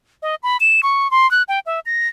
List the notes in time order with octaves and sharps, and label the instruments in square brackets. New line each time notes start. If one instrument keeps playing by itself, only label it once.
[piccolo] D#5
B5
E7
C#6
C6
F#6
G5
E5
A#6